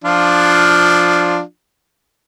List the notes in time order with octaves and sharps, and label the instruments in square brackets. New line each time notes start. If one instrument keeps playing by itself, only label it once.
[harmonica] F3 D4 F4